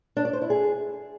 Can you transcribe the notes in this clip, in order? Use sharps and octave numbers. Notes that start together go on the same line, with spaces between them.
D4
D5
C5
E4
G#4